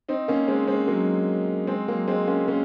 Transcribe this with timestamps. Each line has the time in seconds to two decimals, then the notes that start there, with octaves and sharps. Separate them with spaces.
0.08 C4 D#4
0.28 A#3 C#4
0.48 G#3 C4
0.68 G#3 C4
0.87 F#3 A#3
1.67 G#3 C4
1.88 F#3 A#3
2.08 G#3 C4
2.27 A#3 C#4
2.48 A#3 C#4